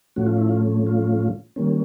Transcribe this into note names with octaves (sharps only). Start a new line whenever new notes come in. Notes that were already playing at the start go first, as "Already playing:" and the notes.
A2 F3 A3 C#4 F#4
F4
E4
F4
F4
D#3 G3 A#3 C#4